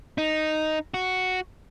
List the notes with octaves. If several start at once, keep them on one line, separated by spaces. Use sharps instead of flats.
D#4
F#4